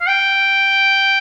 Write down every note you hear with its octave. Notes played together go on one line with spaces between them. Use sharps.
F5
G5